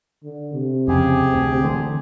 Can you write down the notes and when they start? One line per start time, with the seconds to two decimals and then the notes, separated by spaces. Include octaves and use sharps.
0.24 D3
0.53 C3
0.88 F2 C#3 G4 G#4
1.34 D2
1.63 D3 E3 A3